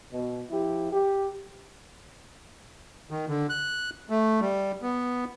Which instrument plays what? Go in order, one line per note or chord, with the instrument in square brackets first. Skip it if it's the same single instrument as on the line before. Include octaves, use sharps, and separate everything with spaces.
[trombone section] B2
F3 E4 G4
G4
[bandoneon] D#3
D3
F#6
A3
G3
B3